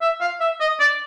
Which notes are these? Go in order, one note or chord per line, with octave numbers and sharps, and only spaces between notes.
E5
F5
E5
D#5
D5